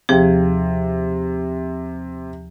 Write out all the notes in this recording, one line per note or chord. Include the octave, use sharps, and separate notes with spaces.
D#2 C3 F3 G#4